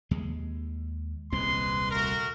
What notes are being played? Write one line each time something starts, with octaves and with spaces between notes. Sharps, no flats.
D#2 G#3
D#1 C2 G#3 C4 B4 C6
A3 F#4 A#4